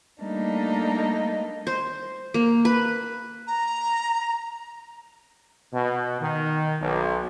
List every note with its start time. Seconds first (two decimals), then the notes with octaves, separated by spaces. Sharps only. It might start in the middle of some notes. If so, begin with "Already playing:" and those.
0.22 G3 A3 A#3 D4 D#4
1.67 C5
2.34 A#3
2.65 B4
3.47 A#5
5.73 B2
6.20 D#3
6.81 B1